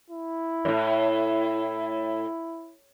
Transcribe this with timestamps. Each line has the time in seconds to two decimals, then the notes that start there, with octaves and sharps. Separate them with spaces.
0.11 E4
0.65 F#2 A2